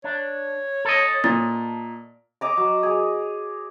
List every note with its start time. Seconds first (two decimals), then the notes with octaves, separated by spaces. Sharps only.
0.04 D4 C#5
0.85 A4 D#5
1.24 A#2 A6
2.41 C#5 D#5 A#5 D6
2.57 F#3
2.83 G#4